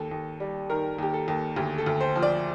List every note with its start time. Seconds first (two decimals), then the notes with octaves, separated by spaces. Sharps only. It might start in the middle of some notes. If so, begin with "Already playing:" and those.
Already playing: D#2 A4
0.11 D#2
0.40 G3
0.70 D#3 A#4
0.99 D#2 G4
1.14 A4
1.28 D#2
1.56 D2 G4
1.78 A4
1.86 D2
2.01 C5
2.16 F3
2.22 D5